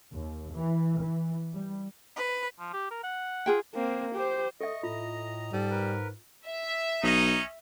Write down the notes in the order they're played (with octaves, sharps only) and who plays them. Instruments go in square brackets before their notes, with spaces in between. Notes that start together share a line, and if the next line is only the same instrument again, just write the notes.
[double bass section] D#2
E3
E3
G3
[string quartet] B4
[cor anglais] F3
G4
A#4
F#5
[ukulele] F4 G#4 G5
[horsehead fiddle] A#3 C4
G4 C5
[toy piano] A4 E5 [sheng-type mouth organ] D#5 C#6
[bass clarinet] A2 [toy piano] F4 [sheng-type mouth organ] D#5 A#5
[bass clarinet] G#2 [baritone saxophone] G3 [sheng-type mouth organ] A4
[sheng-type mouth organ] A#4 B4
[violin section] E5
[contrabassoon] B1 [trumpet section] C#4 D#4 D#5